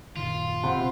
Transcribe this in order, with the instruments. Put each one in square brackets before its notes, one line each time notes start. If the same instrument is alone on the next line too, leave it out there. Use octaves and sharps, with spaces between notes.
[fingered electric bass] F#1 A#2 D#3 [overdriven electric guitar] F4
[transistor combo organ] C3 [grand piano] F#5 B5 C6